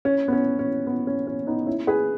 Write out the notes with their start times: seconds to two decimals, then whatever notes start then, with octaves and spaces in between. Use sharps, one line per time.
0.05 C#4
0.28 B3
0.32 C#4
0.59 C#4
0.87 B3
1.07 C#4
1.27 C#4
1.47 B3 D#4
1.67 C#4 E4
1.87 G#4 B4